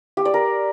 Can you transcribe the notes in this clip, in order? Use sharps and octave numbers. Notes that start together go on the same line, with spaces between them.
G4
D5
A#4